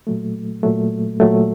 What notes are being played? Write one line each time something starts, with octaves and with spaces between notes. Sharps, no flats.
A#2 F#3 A3
A#2 F#3 A3
A#2 F#3 A3